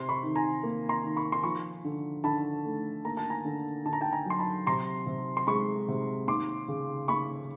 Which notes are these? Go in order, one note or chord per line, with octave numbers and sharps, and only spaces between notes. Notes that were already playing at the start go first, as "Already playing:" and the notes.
Already playing: C3 C6
B5 C#6
D#3
G#5 A#5
A#3
A#5 C6
D#3
B5 C#6
C6
F3 B5 C#6
D3
D3 A5 B5
A3
A#3 A#5
A5
G#5 A#5
D3
D3 A5
A#5
G5 A5
G#5 A#5
F#3 C6
A5 B5
C3 A#5 C6
C3
C6
G#3 B5 C#6
C3
D#2 C6 D6
C#3
D#2 B5 C#6